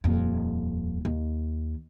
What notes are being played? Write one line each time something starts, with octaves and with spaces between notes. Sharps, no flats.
D#1 F2
D#2